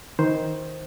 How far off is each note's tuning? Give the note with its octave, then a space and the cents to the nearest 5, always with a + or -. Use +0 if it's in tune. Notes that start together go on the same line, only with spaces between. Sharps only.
D#3 +15 C5 +0